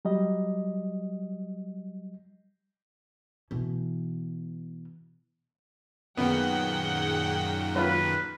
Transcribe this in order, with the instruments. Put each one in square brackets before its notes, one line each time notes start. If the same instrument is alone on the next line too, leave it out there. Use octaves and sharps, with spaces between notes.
[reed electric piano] F#3 G3 D#5
[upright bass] B2 E3
[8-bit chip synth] F#2 A#2 D#3 [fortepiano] B3 [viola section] G#4 F#5 G5
[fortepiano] F#3 F4 [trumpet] B4